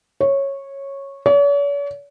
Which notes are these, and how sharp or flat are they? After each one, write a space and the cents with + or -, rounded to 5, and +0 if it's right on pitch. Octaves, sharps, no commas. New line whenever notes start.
C#5 -10
C#5 +45